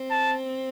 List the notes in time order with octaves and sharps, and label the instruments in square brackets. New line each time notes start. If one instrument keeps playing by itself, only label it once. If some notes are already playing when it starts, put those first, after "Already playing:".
Already playing: [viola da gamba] C4
[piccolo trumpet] A5